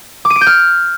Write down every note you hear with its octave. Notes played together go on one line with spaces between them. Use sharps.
D6
D#7
D7
G6
F6